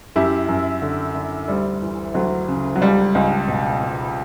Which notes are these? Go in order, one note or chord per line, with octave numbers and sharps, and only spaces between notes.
F#2 E4 G4
F#2
D3
D3
D2 G3
E3
D2 F#3
C#3
F#3
C#2 G3
C#2
B2
B2